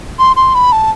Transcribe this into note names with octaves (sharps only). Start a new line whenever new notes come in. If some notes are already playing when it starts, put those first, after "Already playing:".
C6
C6
B5
A5